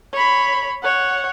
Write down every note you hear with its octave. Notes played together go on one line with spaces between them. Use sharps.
C#5 B5
C#5 F#5